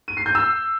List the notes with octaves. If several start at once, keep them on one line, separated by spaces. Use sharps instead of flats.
D#7
C7
G6
E6